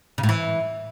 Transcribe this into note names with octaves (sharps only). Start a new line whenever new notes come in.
C#3
A2
E3